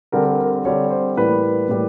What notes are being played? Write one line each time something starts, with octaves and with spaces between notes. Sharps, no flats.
D3 G3 C4 A#4
A#4
A#4
D3 G3 C4 C#5
C5
A2 E3 G3 A#3 B4
A2 E3 G3 A#3